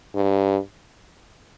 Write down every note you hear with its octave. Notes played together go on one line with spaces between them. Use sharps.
G2